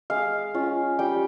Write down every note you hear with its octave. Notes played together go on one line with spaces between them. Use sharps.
G#3 F5
C#4 F4
G3 G5